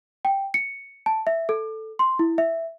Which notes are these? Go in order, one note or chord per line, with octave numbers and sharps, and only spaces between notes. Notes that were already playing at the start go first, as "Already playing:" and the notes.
G5
C#7
A5
E5
A4
C6
E4
E5